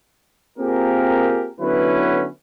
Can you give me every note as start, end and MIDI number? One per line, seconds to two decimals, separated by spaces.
0.58 1.50 58
0.58 1.50 60
0.58 1.50 65
0.58 1.50 67
0.58 1.50 68
0.58 1.50 70
1.60 2.27 50
1.60 2.27 54
1.60 2.27 59
1.60 2.27 61
1.60 2.27 64
1.60 2.27 71